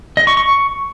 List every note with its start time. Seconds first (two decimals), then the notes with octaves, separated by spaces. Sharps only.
0.17 D#5
0.27 C#6
0.37 C#6